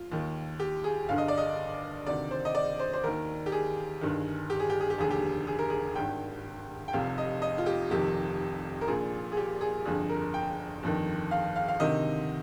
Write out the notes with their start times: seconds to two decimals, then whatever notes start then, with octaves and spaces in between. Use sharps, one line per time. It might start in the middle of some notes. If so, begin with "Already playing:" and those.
Already playing: F4
0.12 D#2 D#3
0.60 G4
0.84 G#4
1.09 G1 G2 D3 F5
1.18 D#5
1.28 D5
1.38 D#5
2.06 D2 C3 D#3 D5
2.31 C5
2.45 D#5
2.55 D5
2.79 C5
2.93 C5
3.04 D#2 D#3 A#4
3.46 G4
3.52 G#4
4.01 G1 G2 D#3
4.50 G4
4.60 G#4
4.70 G4
4.81 G#4
4.90 G4
4.98 F1 D#2 D3 G#4
5.11 G4
5.47 G#4
5.59 A#4
5.70 G#4
5.95 G#1 G2 D#3 G5
6.88 G5
6.93 F1 F2 C3 F5
7.18 D#5
7.42 D#5
7.58 F4
7.66 G4
7.90 F1 F2 C3 D#3 G4
8.81 A#4
8.88 A#1 A#2 G#4
9.32 G#4
9.37 G4
9.61 G#4
9.85 G1 F2 D3 G#4
10.09 A#4
10.34 G5
10.83 G1 F2 D#3
11.31 F5
11.56 F5
11.68 F5
11.80 D2 C3 D#3 D#5